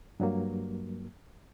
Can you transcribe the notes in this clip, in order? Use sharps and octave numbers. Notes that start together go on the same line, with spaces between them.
G2 F#3 A#3